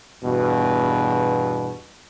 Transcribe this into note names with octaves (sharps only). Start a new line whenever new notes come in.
E2 G2 B2